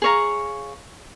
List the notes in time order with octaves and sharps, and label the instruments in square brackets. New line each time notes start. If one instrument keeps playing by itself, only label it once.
[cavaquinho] G#4 C#5 F5 A#5